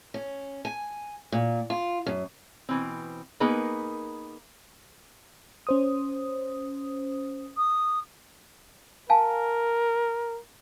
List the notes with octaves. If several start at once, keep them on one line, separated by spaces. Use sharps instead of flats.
C#4
G#5
A#2
F4
F#2
B2 E3 C4
A#3 B3 D#4 G#4 A#4 B4
C#4 C5 D#6
D#6
A#4 F5 G#5 A5